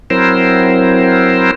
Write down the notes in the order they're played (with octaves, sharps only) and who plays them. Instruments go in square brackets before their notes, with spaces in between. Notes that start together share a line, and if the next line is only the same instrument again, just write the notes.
[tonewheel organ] F#3 C4 E4 A#4 C5